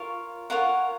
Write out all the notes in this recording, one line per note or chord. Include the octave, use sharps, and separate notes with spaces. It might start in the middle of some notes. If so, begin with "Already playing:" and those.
Already playing: F4 A#4 C#5
F4 A#4 C#5 F#5